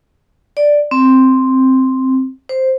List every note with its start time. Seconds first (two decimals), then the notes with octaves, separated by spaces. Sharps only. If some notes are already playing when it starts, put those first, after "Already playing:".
0.57 D5
0.91 C4
2.49 C5